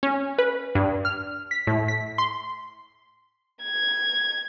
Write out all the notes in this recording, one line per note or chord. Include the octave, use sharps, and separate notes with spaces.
C#4
B4
G2
F6
B6
A2
B6
C6
G#6